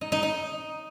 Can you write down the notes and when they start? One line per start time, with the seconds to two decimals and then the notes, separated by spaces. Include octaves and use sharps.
0.01 D#4
0.12 D#4
0.23 D#4